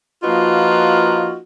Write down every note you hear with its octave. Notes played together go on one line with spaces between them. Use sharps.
F3 A#3 D#4 F4 F#4 B4